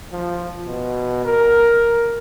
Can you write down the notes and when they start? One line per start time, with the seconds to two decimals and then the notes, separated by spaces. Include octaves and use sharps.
0.12 F3
0.67 B2
1.25 A#4